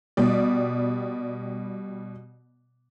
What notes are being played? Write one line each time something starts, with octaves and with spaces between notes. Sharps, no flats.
B2 G3 D5